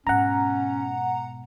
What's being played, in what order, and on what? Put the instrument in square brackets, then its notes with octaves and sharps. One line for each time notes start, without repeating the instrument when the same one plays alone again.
[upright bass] G#2 B2 [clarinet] C#4 [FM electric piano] F#5 A#5